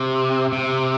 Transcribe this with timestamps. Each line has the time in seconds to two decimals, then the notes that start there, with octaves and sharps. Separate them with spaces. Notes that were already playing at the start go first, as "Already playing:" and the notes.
Already playing: C3
0.53 C3